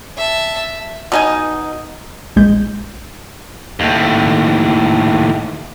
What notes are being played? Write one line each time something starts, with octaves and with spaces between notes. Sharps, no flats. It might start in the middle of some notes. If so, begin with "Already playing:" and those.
E5 A5
B2 D#4 G#5
A#1 G#3 G6
D#2 A2